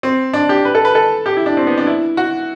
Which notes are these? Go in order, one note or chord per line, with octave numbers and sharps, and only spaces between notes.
C4
D4
G4
B4
A4
B4
A4
G4
E4
D4
C4
B3
D4
E4
F#4